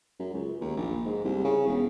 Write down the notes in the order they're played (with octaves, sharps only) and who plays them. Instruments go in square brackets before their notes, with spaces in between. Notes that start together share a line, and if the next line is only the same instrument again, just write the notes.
[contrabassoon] F#2
C#2
D#2
A#1
G#2
C2
C#3
E1